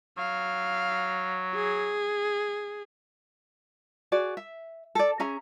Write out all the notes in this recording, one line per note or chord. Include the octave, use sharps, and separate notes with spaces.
F#3 F5
G#4
F#4 G#4 D5
E5
A4 D5
C#4 G#4 E5 A#5